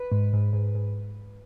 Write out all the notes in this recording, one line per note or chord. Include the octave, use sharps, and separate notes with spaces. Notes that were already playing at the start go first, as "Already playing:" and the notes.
Already playing: B4
G#2
G#2
G#2
G#2